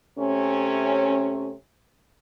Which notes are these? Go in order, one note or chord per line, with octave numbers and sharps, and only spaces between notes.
C3 A3 C#4